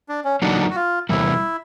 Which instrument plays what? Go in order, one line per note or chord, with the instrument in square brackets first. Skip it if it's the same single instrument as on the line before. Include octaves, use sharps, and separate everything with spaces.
[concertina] D4
C#4
[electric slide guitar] D3 F#3 A#3 D#4 F#4 [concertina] D4
[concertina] F#4
F4
[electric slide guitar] E2 C3 G3 A#3 [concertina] E4